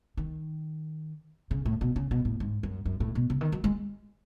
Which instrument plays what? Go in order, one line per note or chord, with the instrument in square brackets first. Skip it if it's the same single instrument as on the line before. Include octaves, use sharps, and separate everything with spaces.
[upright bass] D#3
C#3
A2
B2
C#3
B2
A2
G#2
F#2
F#2
A2
B2
C#3
D#3
F#3
G#3